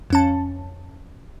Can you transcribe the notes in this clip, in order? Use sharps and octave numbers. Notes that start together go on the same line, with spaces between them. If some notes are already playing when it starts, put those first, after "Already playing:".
F2 C#4 A5